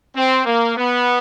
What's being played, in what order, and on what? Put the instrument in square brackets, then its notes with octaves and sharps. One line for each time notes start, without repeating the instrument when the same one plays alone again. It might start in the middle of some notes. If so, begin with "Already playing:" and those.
[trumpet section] C4
A#3
B3